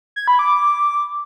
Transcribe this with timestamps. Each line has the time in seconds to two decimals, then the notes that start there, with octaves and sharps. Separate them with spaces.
0.16 G#6
0.28 B5
0.39 D6